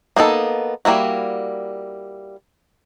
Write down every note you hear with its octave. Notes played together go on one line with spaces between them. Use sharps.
A#3 B3 D#4 A4
G3 A#3 E4 F#4